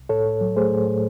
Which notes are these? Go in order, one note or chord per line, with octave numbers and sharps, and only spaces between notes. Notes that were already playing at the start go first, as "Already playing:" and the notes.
Already playing: C2
A2 A4 C#5
A2
F#3
A3 G#4 C5
A2
A2